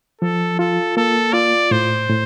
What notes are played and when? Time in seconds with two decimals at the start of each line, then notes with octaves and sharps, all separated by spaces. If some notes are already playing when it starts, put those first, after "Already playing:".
0.21 F3 A4
0.59 F4 A4
0.97 A#3 A4
1.33 F4 D5
1.71 A2 C5
2.09 A2